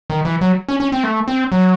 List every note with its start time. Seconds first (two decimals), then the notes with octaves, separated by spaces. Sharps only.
0.10 D#3
0.25 E3
0.41 F#3
0.69 C#4
0.80 C#4
0.92 C4
1.04 A3
1.28 C4
1.52 F#3